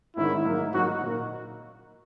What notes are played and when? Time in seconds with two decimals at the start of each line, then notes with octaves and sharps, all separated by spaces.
0.17 G#1 G#2 D#3 G#3 C#4 E4
0.45 G#2 F#3 A#3 D#4
0.74 G#2 F#3 A#3 D#4 F#4
1.03 A#2 A#3 D#4 F#4